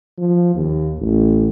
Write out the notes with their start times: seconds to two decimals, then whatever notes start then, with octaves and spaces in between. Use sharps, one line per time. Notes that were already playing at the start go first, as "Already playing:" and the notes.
0.18 F3
0.54 D#2
1.00 A1